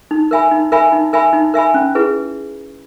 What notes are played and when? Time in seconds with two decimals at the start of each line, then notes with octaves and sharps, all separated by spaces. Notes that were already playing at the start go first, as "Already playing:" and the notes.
0.11 D#4
0.31 A#4 E5 G#5 B5
0.51 D#4
0.72 A#4 E5 G#5 B5
0.92 D#4
1.13 A#4 E5 G#5 B5
1.33 D#4
1.54 A#4 E5 G#5 B5
1.74 C#4
1.95 E4 G#4 B4